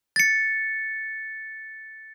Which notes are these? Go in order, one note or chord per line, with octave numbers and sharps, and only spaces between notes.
A6 C#7